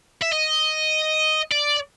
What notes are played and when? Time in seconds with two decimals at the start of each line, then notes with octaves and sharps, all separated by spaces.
0.22 E5
0.33 D#5
1.52 D5